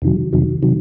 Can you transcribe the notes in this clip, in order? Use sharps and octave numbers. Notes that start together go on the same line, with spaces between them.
F2 C3 D#3 F#3
F2 C3 D#3 F#3
C3 D#3 F#3